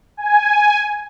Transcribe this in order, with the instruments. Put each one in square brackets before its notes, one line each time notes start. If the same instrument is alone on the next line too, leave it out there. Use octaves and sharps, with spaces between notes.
[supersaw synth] G#5